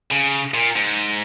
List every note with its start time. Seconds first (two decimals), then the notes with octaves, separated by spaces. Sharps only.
0.11 C#3
0.54 A#2
0.76 G#2